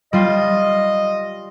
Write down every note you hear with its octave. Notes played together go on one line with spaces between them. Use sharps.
G3 F4 D#5